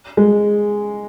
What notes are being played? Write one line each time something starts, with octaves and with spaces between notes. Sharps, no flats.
G#3